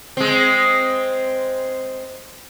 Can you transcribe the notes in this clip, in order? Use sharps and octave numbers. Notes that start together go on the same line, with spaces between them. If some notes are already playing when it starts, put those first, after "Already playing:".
G#3 C4